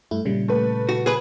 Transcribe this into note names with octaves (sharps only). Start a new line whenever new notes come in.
G2 A3 E4
A#2 C#3 G3
A3 B4
F#4
G#4 B4